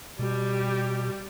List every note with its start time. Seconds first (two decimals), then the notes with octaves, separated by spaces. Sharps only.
0.19 B2 G3 G4